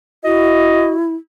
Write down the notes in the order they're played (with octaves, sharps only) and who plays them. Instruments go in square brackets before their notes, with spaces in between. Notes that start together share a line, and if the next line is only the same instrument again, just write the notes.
[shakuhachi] E4 [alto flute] F#4 [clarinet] D#5